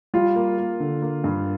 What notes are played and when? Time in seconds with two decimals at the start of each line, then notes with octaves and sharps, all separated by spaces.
0.14 G3 F4
0.36 A#3
0.58 A#3
0.80 D3
1.02 A#3
1.24 G2